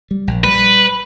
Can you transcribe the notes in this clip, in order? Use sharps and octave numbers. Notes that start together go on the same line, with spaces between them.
G3
A#1
G3 B4